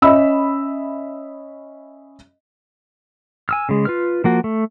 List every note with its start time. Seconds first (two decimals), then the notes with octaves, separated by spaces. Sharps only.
0.02 C#4 D#5 E5 B5 E6
3.49 G#5 E6 F6
3.69 C#3 G#3
3.85 F4 B4 F6
4.24 F3 A#3 F#4
4.44 A3